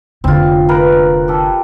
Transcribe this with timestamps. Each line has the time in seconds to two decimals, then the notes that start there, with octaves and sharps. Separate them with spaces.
0.24 F1 D3 C4 F4
0.69 A#4 B4
1.28 G4 A4